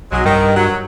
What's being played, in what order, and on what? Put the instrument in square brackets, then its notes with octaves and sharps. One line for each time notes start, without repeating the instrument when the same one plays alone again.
[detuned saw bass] B1 [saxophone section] F#3 G#3
[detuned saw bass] G2 [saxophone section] D#3
[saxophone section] F#3